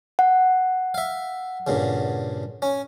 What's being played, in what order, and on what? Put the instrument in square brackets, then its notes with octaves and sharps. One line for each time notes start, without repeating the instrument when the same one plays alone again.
[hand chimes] F#5
[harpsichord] E5 F5
G2 A#2 C#3
C#4